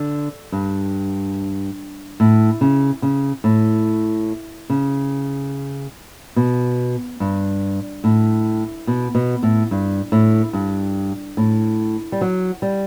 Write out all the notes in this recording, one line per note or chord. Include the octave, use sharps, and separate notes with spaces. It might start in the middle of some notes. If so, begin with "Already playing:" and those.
Already playing: D3
G2
A2
C#3
C#3
A2
C#3
B2
G2
A2
B2
B2
A2
G2
A2
G2
A2
G3
F#3
G3